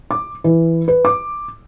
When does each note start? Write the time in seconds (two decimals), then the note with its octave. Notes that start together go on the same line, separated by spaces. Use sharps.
0.11 D6
0.44 E3
0.88 B4
1.05 D6